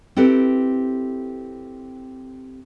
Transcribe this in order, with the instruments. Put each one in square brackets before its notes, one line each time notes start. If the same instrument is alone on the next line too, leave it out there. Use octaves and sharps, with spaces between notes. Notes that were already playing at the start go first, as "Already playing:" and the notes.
[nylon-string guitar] C4 E4 G4 A4 B4